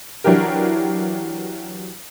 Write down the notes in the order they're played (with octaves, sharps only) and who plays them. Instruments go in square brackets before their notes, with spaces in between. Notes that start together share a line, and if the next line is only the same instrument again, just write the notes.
[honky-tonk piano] E3 F#3 D4 E4 G4 A#4